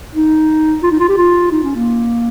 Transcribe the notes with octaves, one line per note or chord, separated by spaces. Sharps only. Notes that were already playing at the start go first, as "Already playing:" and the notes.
D#4
F4
D#4
F4
G4
F4
D#4
C#4
A#3